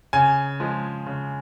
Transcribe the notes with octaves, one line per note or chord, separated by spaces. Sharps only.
C#3 G#5
F3 G#3
C#3